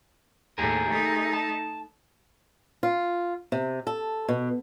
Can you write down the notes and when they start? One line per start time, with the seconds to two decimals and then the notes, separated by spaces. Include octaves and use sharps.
0.58 D#2 A2 G4 G#4 A#4
0.90 A3 D#4
1.33 A5
2.83 F4
3.52 C3
3.87 A4
4.28 B2